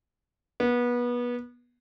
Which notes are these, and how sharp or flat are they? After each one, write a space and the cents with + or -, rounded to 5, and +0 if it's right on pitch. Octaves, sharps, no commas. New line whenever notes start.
B3 -25